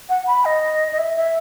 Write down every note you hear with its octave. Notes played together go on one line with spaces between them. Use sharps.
F#5
B5
D#5
D#5
E5
E5